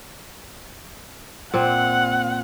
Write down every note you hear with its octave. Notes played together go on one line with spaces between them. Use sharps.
A#2 C4 F#5